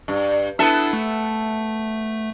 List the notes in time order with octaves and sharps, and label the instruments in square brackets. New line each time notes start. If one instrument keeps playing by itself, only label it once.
[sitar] G2
[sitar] B3 A4 E5 [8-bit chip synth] D4 E4
[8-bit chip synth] A3